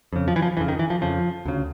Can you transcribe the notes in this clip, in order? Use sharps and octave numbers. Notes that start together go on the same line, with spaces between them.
F2 C#3
F3
E3
F3
F2 C#3 E3
D#3
E3
F3
F2 C#3 F3
D2 C#3